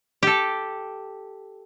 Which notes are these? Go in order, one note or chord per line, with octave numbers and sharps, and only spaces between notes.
G4 A4